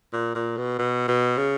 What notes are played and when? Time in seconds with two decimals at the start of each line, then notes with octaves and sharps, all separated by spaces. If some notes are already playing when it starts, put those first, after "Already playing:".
0.13 A#2
0.35 A#2
0.57 B2
0.79 B2
1.08 B2
1.38 C#3